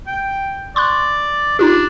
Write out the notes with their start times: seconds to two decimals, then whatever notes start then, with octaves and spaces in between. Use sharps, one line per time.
0.07 G5
0.76 D5 C6 C#6 F#6
1.59 D4 D#4 F4 G4